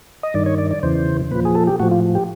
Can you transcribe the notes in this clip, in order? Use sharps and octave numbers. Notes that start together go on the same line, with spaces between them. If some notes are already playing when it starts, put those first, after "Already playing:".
D#5
G2 D#3 D5
C#5
D5
D5
E2 C#3 E3 C5
A#2 F3 B4
G#4
A4
G4
A2 F3 F#4
F4
G4